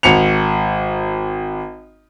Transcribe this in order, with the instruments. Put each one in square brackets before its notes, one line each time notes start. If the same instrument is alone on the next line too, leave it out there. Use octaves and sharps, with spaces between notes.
[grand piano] G#1 C#7 F7